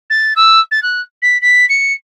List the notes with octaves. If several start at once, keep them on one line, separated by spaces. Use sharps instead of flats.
A6
E6
A6
F#6
B6
B6
C#7